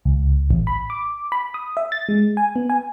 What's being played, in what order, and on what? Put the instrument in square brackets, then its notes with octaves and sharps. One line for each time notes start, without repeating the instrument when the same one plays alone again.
[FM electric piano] C#2
A1
B5
D6
B5
D#6
E5
A6
G#3
G#5
B3
G#5